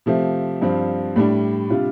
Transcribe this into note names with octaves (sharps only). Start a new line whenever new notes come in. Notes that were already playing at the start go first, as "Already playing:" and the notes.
C3 F3 A3 C4
G2 F3 C4
A2 G3 D4
C3 G3 D4 F4